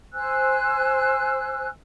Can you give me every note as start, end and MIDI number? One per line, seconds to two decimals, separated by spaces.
0.14 1.68 72
0.14 1.68 80
0.14 1.68 88
0.14 1.68 90